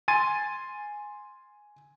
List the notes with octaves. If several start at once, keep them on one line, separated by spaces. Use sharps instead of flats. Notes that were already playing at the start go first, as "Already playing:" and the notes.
G#5 C6 G#6 A6 D#7